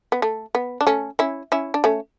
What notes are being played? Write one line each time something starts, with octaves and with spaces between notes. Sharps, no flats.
B3
A3
B3
D4
A3 C#4
C#4 E4
C#4 E4
D4
A3 C#4